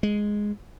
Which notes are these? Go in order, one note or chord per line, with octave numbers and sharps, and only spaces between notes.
G#3